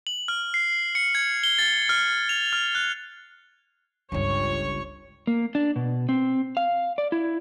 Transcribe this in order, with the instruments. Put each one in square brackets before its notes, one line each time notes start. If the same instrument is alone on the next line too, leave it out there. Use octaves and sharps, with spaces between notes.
[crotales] F#7
F6
C7
C#7
G#6
G7
A6
F6
F7
F6
F#6
[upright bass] G1 C#2 [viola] C#5 C#6
[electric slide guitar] A#3
D4
B2
C4
F5
D5
E4